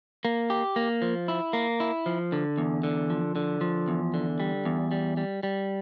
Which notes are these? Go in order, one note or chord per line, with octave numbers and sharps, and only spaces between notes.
A#3
G4
A#3
F3
E4
A#3
E4
F3
D3
E2
D3
F3
D3
F3
E2
D3
G3
E2
G3
G3
G3